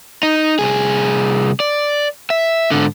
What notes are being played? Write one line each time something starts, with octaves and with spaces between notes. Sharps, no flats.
D#4
C2 G#4
D5
E5
G#2 D3